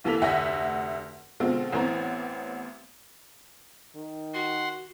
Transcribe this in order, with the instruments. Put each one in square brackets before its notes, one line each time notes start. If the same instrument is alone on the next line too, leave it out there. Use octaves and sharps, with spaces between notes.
[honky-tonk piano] C2 E3 A#3 A4 B6 F7
F1 D2 E5 F#5 G#5 A#6
B2 D3 G#3 C4 F4
A1 E3 B3 C4 A#5
[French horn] D#3
[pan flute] F#4 [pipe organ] F#5 C6